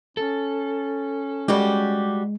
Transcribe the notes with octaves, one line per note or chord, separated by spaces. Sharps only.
C#4 A4
G3 G#3 F#4 G4